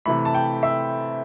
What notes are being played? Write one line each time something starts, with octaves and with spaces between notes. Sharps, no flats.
C3 E3 A3 B5
A5
G5
E5